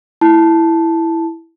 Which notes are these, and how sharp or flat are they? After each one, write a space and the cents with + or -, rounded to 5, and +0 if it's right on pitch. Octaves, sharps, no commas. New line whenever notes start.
E4 +0 A5 +0